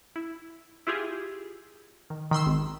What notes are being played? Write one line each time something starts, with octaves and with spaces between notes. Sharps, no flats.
E4
E4 F4 G4 G#4
D#3
D#3 B5 C6 E6
G#1